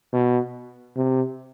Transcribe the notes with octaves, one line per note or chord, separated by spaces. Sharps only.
B2
C3